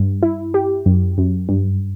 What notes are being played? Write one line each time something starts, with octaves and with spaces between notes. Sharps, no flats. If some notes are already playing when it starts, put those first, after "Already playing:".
Already playing: G2
E4
G4
F#2
F#2
G2